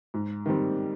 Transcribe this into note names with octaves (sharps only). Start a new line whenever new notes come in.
G#2
D#3 G3 C4